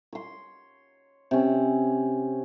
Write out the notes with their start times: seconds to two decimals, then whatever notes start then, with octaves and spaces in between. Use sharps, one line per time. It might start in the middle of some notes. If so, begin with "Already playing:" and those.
0.13 C#5 C6
1.31 C3 C#4